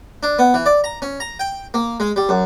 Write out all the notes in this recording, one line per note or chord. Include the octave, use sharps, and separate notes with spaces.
D4
B3
E3
D5
A#5
C#4
A#5
G5
A#3
G#3
G3
F#2